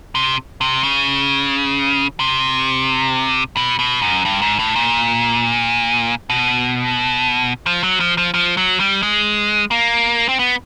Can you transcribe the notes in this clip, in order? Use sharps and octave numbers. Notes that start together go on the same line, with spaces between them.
C3
C3
C#3
C3
B2
B2
F#2
G2
G#2
A2
A#2
B2
F3
F#3
F3
F3
F3
F#3
G3
G#3
A#3
C4
B3